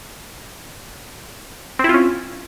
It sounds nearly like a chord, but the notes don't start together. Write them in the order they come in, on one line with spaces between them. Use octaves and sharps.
C4 E4 F4 C#4